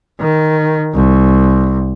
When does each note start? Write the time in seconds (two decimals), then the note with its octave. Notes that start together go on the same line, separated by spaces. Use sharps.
0.20 D#3
0.94 C2